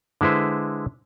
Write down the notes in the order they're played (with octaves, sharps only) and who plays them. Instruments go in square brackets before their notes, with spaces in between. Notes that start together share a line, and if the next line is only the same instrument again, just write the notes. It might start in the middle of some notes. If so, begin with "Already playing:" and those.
[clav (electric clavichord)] D3 G#3 E4 B4 C5